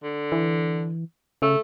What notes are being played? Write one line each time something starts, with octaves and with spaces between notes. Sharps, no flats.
D3
E3
C#3 A3